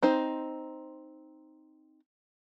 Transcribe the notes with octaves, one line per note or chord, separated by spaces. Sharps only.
C4 D#4 C5